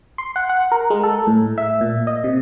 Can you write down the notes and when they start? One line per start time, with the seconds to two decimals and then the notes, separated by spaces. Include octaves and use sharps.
0.18 C6
0.36 F#5
0.49 F#5
0.72 A#4
0.90 G#3
1.03 A4
1.27 A2
1.58 E5
1.81 A#2
2.07 D#5
2.24 C3